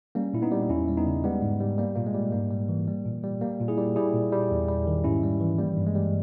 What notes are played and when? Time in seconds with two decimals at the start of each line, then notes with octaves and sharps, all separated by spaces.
0.15 G3 A#3 C#4
0.34 A#2 E4
0.42 B3 D#4
0.52 G3
0.69 E2 C#4 E4
0.88 G3
0.97 B3 D#4
1.06 C#3
1.24 G3 G#3 B3
1.42 G#2
1.60 G3
1.78 G3 A#3
1.95 A#2 A#3
2.06 G#3
2.14 G3
2.32 G#2 A#3
2.51 G3
2.69 E3
2.88 G3
3.06 A#2
3.23 G3
3.41 G3 A#3
3.60 A#2
3.68 E4 G#4
3.78 G3
3.96 G3 E4 G#4
4.14 A#2
4.32 G3
4.51 E2
4.68 G3
4.87 D#3
5.04 G#2 C#4 E4
5.23 G3
5.40 E3
5.58 G3 A#3
5.77 G2
5.87 G#3
5.95 G3